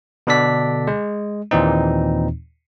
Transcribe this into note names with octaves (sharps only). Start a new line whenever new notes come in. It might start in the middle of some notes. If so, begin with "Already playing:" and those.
B2 D3 D4 A4 D5 B6
G#3
D#2 A#2 E3 C4 D#4